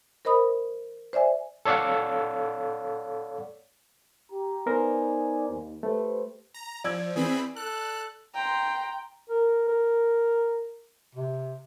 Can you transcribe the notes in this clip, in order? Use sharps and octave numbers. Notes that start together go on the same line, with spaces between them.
A#4 C5 D#5 B5 D#6
C5 D5 E5 G#5
A4 C#5 D5 F5 F#5
G4 A#5
B3 D#4 A#4 C5 D5 G#5
D#2
A3 G4 B4 C5
A#5
F3 D5 E6 G#6
E3 C4 G#4 B5
A4 F#6
G5 A#5 C6
A#4
A#4
C3